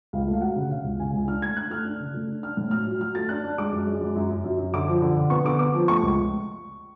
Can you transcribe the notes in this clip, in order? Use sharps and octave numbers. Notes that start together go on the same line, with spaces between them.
C#2 F5
A3
F5
F#3 F#5
C#3
C#3 F5
C#2
C#3 G#5
C#2
D4 F6
A3 G#6
D4 F#6
A3 F6
D4
C#3
A3
D4
D4 F6
A2
F#3 F6
F#3
F#3 F6
A3 A6
D4 F#6
D4
G#3 D6
F#2
G#3
F#2
F#2
F#2
F#2
F#2
D3 D6
F3
D3
D3
B3 C#6
D3 D6
B3 D6
F3
A3 C#6
C#2